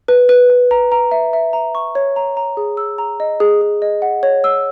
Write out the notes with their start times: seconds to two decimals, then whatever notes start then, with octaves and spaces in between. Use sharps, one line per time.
0.08 B4
0.29 B4
0.50 B4
0.71 A#5
0.92 A#5
1.11 E5
1.33 E5
1.53 A#5
1.75 C#6
1.95 C#5
2.16 A#5
2.37 A#5
2.57 G#4
2.77 E6
2.98 A#5
3.20 D#5
3.40 G#4
3.61 G#4
3.82 D#5
4.02 F#5
4.23 C#5
4.44 E6